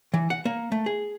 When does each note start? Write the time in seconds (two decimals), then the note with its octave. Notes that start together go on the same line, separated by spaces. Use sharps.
0.14 E3
0.30 F#5
0.45 A#3
0.72 A3
0.86 G#4